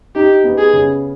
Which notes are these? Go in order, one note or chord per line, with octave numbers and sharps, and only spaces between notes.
D#4 G4
B3
G#4
C#3